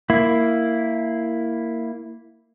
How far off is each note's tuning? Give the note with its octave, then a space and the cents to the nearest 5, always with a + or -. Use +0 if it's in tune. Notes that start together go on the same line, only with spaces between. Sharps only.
A#3 -10 E4 +0